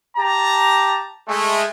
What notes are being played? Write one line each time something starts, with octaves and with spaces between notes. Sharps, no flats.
G4 A5 A#5
G#3 A3